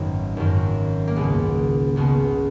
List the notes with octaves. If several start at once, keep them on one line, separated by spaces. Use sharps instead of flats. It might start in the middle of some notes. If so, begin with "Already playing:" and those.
Already playing: G#1 F#2 D#3 B3
G#1 F#2 D#3
A#3
C#2 B2 G#3 B3
C#2 B2 G#3 B3